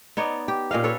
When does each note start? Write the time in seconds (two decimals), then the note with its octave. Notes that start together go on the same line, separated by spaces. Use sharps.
0.17 B3 D#4 C#5 D5
0.48 G4
0.71 A#2 C#4 D#5 F5
0.84 A4 B4 C#5